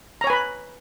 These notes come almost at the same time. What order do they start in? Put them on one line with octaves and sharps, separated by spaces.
A#5 C#5 G#5 B4 B5